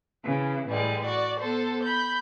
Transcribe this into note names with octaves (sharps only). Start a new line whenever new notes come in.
C#3 E3
A2 E3 G3 G#3
F#4 D5
B3 A4 C5
B5 G6